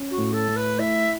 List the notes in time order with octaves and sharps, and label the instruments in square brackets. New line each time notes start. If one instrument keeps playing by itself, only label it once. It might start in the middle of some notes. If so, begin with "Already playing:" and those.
Already playing: [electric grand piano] C#4
[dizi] F#4
[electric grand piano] A2
[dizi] A4
[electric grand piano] A3
[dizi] B4
[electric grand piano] E4 [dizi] E5